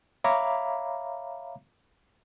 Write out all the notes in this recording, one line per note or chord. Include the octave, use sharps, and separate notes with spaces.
C#5 E5 F5 A#5 B5 D6